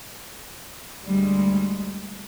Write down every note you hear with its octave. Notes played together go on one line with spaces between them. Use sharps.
D2 G3 G#3